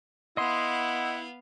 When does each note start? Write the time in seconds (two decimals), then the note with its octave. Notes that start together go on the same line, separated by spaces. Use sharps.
0.37 B3 E4 D#5 F5 F#5 C6